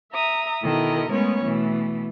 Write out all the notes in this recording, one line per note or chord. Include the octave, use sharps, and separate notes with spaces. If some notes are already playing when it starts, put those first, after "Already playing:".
E5 A#5 D#6
B2 D#3 E4 A4 A#4 D#5
G#3 A3 B3 C#4 C#5
B2 E3 A3